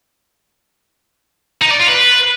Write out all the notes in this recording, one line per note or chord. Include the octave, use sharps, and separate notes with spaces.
D#4
D5
F4
B4